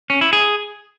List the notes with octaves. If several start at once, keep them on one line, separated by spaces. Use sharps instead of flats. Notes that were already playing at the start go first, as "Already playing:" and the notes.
C#4
E4
G#4